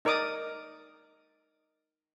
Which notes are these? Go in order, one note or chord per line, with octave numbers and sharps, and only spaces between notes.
D#4 A#4 D5 D6 D#6